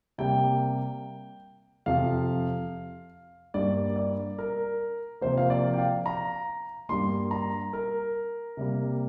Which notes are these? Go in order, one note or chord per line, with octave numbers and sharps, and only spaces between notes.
C3 G3 A#3 G5
F2 C3 F3 F5
G2 G3 A#3 D5
D5
A#4
C3 F3 A#3 C5
F5
D5
G5
F5
A#5
G2 G3 A#3 C6
A#5
A#4
C3 G3 A#3